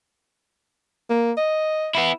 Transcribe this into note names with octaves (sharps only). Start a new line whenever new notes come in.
A#3
D#5
B3 E4